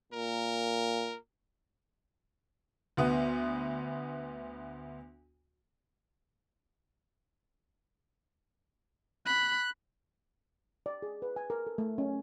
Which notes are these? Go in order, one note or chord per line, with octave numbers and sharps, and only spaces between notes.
A#2 A#4
D2 B3
B5 F#6
D5
G#4
B4
G#5
A#4
A4
A3
C#4